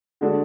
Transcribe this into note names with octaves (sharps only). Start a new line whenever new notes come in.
D3 G#3 D4 F#4